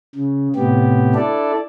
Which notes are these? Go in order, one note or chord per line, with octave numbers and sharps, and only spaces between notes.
C#3
A2 C3 B3 G4
D4 E4 A4 D5